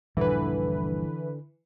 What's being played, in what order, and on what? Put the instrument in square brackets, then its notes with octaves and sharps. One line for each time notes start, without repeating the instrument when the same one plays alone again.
[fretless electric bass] D#1 A#1 G2 [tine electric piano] D3 [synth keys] E3 B4